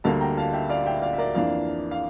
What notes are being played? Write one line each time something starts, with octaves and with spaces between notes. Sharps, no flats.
D2 D3 G3 A#3 F5 A5
G5 A#5
F5 A5
E5 G5
D5 F5
E5 G5
D5 F5
E5
A#4 D5
F2 E3 A#3 D4 D5 F5
F5